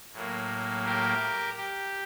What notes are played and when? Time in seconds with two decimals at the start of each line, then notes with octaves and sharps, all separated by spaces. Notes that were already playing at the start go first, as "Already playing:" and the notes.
0.13 A2 F#3 A#3
0.84 G4 A#4
1.57 G4